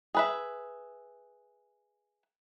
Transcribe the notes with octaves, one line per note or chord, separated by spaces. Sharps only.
G#4 B4 E5